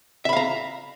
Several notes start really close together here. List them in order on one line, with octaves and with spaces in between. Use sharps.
E5 B5 F5 A#5